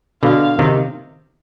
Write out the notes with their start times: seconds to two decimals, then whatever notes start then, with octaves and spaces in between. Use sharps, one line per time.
0.23 B2 D3 F5
0.59 C3 D#3